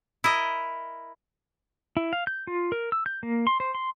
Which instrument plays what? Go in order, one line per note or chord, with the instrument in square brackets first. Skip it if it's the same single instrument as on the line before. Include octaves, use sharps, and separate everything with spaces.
[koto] E4 A#4 D#5
[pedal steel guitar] E4
F5
G6
F4
A#4
E6
G6
A#3
C6
C5
C6